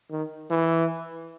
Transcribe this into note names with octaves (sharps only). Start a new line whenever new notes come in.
D#3
E3